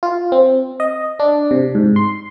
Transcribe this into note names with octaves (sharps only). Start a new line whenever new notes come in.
F4
C4
D#5
D4
C3
G#2
C6